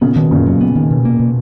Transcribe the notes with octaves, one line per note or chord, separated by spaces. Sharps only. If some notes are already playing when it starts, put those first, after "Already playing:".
A#2 C#3 B3
B2 D#3
F#2 A#2 C#3
F#3
B3
D#3
B2
A#3
B2